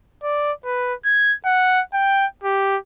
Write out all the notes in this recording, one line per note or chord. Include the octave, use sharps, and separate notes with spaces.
D5
B4
G#6
F#5
G5
G4